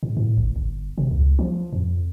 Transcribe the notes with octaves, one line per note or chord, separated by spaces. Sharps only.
G#2
A2
G1
G1
C3
C#2
F3
F2